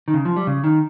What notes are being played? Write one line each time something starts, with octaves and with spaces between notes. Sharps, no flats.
D#3
C#3
F3
G3
C#3
D#3